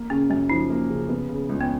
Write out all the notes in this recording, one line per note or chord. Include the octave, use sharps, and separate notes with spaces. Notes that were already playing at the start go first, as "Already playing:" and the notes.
Already playing: A#3
C#3 C#4
F#2 C#4
F3 D#4
A#3
C#3
B3
C#3
C#2
B3